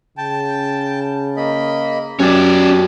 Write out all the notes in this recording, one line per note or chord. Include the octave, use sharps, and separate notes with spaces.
C#3 G5 A5
A#3 D#5 B5
F#2 C#4 G4 D5